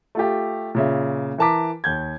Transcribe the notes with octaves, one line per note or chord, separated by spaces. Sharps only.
A3 F4 G4
A#2 C#3 E5
E3 A#4 A5 A#5 D6 B6
D#2 G6 G#6